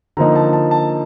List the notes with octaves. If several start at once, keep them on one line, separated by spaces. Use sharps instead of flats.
D3 F3 A#3 D#4 A#5
A5
A5
A5